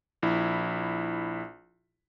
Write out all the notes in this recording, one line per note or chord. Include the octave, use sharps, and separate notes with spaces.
A#1 E4